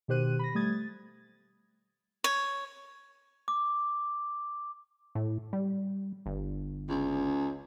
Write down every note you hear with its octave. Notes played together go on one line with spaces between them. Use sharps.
B2 D#3 G4 C5 F#6 D#7
B5 A#6
G3 A3 D#6 G#6 A6
A6
C#5
D6
A2
G3
G1
C#2